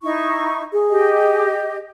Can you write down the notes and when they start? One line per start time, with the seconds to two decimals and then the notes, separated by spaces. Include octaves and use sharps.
0.03 D#4 E4 C#6
0.73 G#4
0.90 G4 D#5